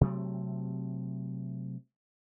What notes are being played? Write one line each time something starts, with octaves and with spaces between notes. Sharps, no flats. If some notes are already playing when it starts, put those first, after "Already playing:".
C3 F#3 A3 C4